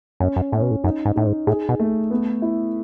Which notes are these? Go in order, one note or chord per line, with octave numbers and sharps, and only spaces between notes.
F#2 C#4
F#2
A2 C#4
B2
A2
F#2 D#4
G#2
A2 D#4
G#2
A2 G#4
B2
A3
B3
E4